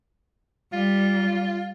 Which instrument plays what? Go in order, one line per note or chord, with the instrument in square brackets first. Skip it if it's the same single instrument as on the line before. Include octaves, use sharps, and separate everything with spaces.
[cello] G3 [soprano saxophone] F4